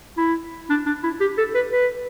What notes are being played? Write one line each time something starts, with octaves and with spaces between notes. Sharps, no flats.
E4
D4
D4
E4
G4
A4
B4
B4